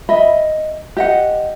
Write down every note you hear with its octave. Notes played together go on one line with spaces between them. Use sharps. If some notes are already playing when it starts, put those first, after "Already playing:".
D#5 E5 B5
G4 D#5 F#5